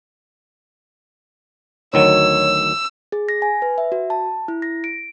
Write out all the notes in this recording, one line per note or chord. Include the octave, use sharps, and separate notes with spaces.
D2 D#3 F#3 C#5 E6
G#4
A#6
G#5
B4
E5
F#4
A5
E4
A#6
D7